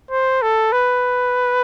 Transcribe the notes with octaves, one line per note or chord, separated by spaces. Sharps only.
C5
A4
B4